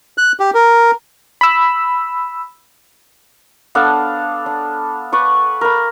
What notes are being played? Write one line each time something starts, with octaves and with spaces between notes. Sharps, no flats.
F#6
G4
A#4
B5 E6
B3 D4 A4 F5
D4
B4 D5 C#6
A#4 B5